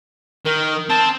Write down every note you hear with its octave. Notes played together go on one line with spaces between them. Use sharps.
D#3 A#4
C4 A5